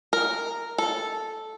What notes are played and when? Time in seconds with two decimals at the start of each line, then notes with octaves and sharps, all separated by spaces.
0.13 A#4
0.78 A4